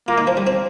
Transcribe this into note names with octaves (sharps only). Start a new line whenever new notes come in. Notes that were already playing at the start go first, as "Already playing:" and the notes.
A#3 F4
D#4
F3
G3
C4